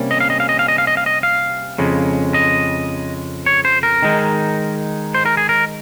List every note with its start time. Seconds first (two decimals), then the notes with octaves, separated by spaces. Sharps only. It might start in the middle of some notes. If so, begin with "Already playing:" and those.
Already playing: C3 G3 A#3 C#4
0.11 D#5
0.20 F5
0.30 D#5
0.40 F5
0.49 D#5
0.59 F5
0.68 D#5
0.78 F5
0.87 D#5
0.97 F5
1.06 D#5
1.23 F5
1.78 F2 C#3 G#3
2.34 D#5
3.46 C#5
3.65 C5
3.83 A#4
4.02 D#3 G#3 D#4
5.14 C5
5.26 A#4
5.37 G#4
5.49 A#4